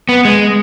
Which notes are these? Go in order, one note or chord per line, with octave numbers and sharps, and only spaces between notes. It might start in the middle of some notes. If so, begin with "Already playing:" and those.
B3
G#3